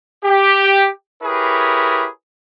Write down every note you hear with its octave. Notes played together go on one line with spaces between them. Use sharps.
G4
E4 G4 G#4 A#4 B4 C#5